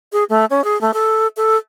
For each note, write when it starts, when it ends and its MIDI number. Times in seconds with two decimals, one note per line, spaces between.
0.13 0.24 68
0.29 0.45 57
0.50 0.64 61
0.64 0.80 68
0.81 0.91 57
0.94 1.28 69
1.37 1.57 69